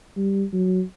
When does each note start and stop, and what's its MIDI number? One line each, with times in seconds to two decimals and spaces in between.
0.16 0.44 55
0.52 0.82 54